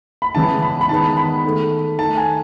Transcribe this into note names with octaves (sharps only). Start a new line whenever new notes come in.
B5
C#3 E3 G#3 B3 A5
B5
B5
D#3 G#3 B3 A5
B5
D#3 A3
D#3 A3 A5
G#5